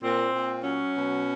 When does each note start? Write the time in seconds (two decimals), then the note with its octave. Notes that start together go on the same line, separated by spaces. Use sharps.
0.03 A#2 C4
0.33 A#2
0.63 F#3 C#4
0.94 B2